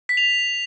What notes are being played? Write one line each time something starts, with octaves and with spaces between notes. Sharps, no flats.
B6
F7